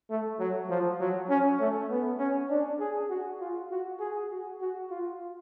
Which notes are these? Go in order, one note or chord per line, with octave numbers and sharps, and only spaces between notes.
A3
F#3
F3
F#3
C#4
A3
B3
C#4
D4
G#4
F#4
F4
F#4
G#4
F#4
F#4
F4